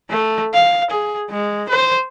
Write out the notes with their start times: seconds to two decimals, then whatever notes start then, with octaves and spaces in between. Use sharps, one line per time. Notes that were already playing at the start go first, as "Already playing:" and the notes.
0.10 A3
0.53 F5
0.90 G#4
1.30 G#3
1.69 C5